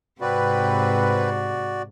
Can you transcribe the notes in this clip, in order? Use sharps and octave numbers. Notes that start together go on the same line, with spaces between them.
G#2 C3 C4 F#4 B4 D5